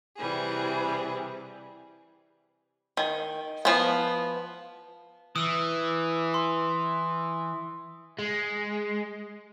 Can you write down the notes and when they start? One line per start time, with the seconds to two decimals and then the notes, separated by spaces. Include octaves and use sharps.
0.17 C3 E3 G3 G#4
2.97 D#3
3.65 F3 B3
5.36 E3 D#6 E6
6.34 C6
8.19 G#3